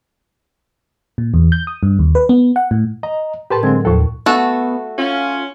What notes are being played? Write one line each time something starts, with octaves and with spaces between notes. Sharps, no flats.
A#2
E2
G6
D#6
G2
D#2
B4
B3
F#5
A2
D#5 A#5
A2 G4 A#4 B4 A5 C6
D3 F#3 G#3 C4 G#6
D#2 A2 F3 A4
A3 B3 F#4 A4
C#4 F4